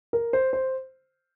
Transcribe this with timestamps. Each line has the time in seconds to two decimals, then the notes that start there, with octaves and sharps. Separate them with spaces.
0.13 A#4
0.33 C5
0.53 C5